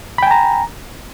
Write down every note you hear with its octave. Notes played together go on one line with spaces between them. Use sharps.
G5 G#5 A#5 B5